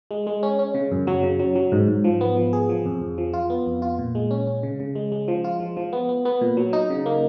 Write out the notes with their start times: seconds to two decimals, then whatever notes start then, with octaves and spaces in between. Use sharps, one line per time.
0.11 G#3
0.27 G#3
0.43 C#4
0.59 C#4
0.75 C#3
0.92 F#2
1.07 F#3
1.23 C#3
1.40 F#3
1.56 F#3
1.72 G#2
1.88 G#2
2.04 F3
2.21 B3
2.37 F3
2.53 G#4
2.69 F3
2.85 F2
3.02 F2
3.18 F3
3.33 F4
3.50 B3
3.66 F2
3.82 F4
3.99 A#2
4.15 G#3
4.31 C#4
4.47 C#4
4.63 C#3
4.80 C#3
4.95 G#3
5.12 G#3
5.28 F3
5.44 F4
5.60 F3
5.77 F3
5.93 B3
6.09 B3
6.25 B3
6.41 A#2
6.57 F#3
6.73 D#4
6.90 C#3
7.06 A#3